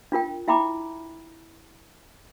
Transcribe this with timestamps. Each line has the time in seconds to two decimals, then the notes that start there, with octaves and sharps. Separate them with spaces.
0.12 D4 F4 A#4 G5
0.48 E4 E5 G5 A#5 B5 D6